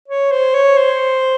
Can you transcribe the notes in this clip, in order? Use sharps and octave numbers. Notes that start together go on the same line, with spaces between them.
C#5
C5
C#5
C5